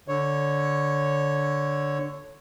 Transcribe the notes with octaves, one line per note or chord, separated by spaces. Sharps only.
D3 C#5